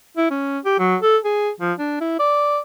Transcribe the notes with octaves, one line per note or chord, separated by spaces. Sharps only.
E4
C#4
G4
F#3
A4
G#4
F3
D4
E4
D5